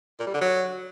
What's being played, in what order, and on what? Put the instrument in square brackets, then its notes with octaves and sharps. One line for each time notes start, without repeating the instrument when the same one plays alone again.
[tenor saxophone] A#2
G3
D3
F#3